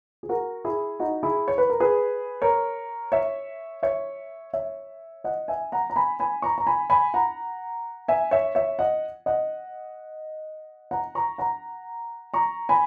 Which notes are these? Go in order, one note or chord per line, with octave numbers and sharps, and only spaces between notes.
G#4
F#4 A#4
E4 G#4
D#4 F#4
E4 G#4
C#5
B4
A#4
G#4 B4
A#4 C#5
C#5 E5
C#5 E5
C#5 E5
D#5 F#5
E5 G#5
F#5 A#5
A#5
G#5 B5
G#5 B5
A#5 C#6
A#5
G#5 B5
G#5 B5
F#5 A#5
E5 G#5
C#5 E5
C#5 E5
D#5 F#5
D#5 F#5
F#5 A#5
A#5 C#6
F#5 A#5
A#5 C#6
G#5 B5